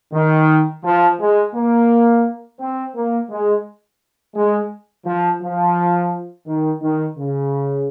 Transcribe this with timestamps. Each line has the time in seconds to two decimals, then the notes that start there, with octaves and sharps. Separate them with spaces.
0.13 D#3
0.84 F3
1.19 G#3
1.54 A#3
2.60 C4
2.95 A#3
3.29 G#3
4.35 G#3
5.05 F3
5.41 F3
6.46 D#3
6.81 D#3
7.17 C#3